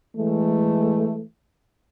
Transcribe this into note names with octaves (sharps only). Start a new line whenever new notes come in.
E3 G#3 A3